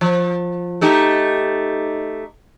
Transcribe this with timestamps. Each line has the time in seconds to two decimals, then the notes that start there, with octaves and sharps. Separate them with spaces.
0.01 F3
0.81 A3 D#4 G4